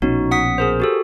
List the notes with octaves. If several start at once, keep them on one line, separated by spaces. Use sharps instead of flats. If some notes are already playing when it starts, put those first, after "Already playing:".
A#1 B2 C#4 D#4 F#4
F#5 D#6 B6
G#4 A#4 C5
F#4 G4 A4